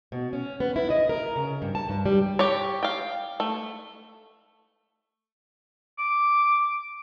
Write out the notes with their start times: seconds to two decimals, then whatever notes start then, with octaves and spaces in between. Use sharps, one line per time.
0.12 B2
0.33 C#4
0.60 B3
0.76 E4
0.90 D#5
1.09 A#4
1.36 C#3
1.62 G2
1.75 A5
1.89 G2
2.06 G3
2.39 G4 C#5
2.83 F5 G5
3.40 A3
5.98 D6